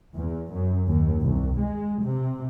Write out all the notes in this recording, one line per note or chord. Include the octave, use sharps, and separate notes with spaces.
E2
F#2
D#2
C2
G#3
C3